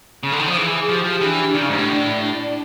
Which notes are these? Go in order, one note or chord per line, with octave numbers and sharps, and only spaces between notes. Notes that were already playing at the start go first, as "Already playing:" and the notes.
C#3
D3
D#3
F3
E3 G#4
F3 G4
F3
E3 D4
D#3 D4
C#3
G#2
A2
D4